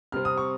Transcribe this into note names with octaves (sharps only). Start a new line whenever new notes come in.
C3 G3 C4 F6
D#6
C#6